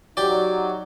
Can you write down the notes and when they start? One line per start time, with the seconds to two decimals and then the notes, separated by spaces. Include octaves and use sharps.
0.17 F#3 D#4 G4 D5